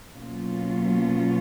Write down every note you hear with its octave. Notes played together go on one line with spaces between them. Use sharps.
B2 F#3 A#3 C#4 F4